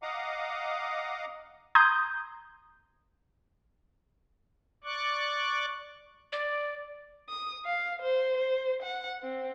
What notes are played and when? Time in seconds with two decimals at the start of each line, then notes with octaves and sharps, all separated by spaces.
0.03 D#5 F5 F#5 A#5 D6 D#6
1.75 A#5 C6 D#6 G6 G#6
4.84 D5 C#6 D6 F#6
6.32 D5
7.29 D#6
7.65 F5
8.02 C5
8.37 C5
8.83 F#5
9.23 C4